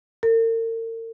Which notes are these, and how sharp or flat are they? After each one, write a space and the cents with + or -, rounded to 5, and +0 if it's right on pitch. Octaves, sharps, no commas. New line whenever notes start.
A#4 -45